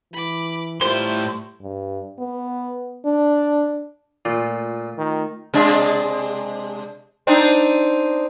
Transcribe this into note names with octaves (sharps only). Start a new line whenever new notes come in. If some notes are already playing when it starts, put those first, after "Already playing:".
E3 B5 D6
A2 G3 E4 F4 C5 C6
G2
B3
D4
A#2 A3 F4
D#3
C3 G#3 D4
C4 D4 D#4